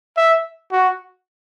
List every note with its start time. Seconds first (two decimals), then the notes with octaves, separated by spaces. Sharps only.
0.17 E5
0.72 F#4